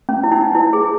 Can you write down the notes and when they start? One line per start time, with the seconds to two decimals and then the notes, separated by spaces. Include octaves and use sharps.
0.09 C#4
0.23 E4
0.32 D#4
0.55 E4
0.73 G#4